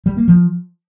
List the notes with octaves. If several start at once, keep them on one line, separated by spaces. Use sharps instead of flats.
G3
A#3
F3